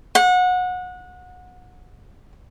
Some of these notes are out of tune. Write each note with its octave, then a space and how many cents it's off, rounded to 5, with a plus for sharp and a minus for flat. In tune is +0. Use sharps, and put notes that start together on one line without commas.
F#5 -25